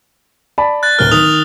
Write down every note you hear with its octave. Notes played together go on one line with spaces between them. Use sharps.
D5 A5 B5
F#6 A6
D1 F#3 A#4 F6 G7
D#3 D#6 F7